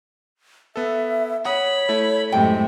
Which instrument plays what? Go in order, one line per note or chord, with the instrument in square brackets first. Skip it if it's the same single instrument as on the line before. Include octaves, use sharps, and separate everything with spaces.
[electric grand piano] B3 A4 [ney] E5
[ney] C#5 [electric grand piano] F#5 D#6 [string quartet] B5
[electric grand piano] A3 E4
[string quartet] F#2 A2 C3 [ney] G#3 [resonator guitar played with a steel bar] G5